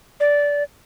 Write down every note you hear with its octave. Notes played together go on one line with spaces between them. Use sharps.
D5